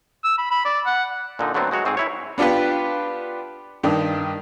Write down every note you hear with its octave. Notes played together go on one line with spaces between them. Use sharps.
E6
B5
B5
D5
F#5
A#2 D3 D#4
D3 F#3 A3 B3 C4 A4
F#3 G#3 F#4 C#5
G#2 C4 G#4
E4 C#5
B3 D4 F4 G4 B4
G2 D#3 D4